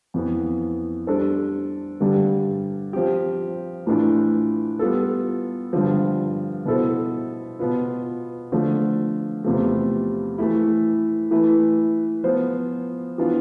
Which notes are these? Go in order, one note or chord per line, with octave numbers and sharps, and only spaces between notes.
F2 E3 B3
G3 D4 A4 C5
G2 D3 G3
F3 C4 G4
A2 E3 A3 D4 F4
G3 B3 F4 A4
G2 D3 F3
B2 B3 E4 A4 C5
B2 B3 F4 B4
D3 F3 A3
E2 C3 F3 A3
E3 A3 E4
E3 A3 E4 B4
F3 B3 F4 C5
E3 B3 D4 F4